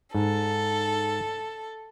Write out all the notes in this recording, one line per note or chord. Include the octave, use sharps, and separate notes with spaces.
G#2 A4